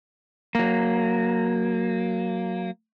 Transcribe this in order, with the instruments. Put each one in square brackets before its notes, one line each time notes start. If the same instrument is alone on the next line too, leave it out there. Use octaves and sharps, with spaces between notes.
[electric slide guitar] F#3 A#3